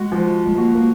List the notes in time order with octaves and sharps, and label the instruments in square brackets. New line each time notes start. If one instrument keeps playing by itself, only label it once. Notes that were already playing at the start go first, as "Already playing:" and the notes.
Already playing: [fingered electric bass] G#3 [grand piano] F#4
[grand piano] F3
[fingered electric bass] G#3
[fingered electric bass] A#3 [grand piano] F#4
[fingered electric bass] A#3